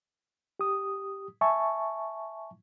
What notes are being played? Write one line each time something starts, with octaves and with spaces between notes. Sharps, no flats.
G4 D#6
E5 G#5 A5 C#6